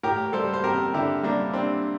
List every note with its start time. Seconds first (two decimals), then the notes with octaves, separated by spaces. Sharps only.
0.03 A2 G4 A#4
0.33 G3 A4 C5
0.54 C5
0.64 C4 G4 A#4
0.94 D3 E4 G4
1.23 G3 A#3 D4
1.53 C4 D4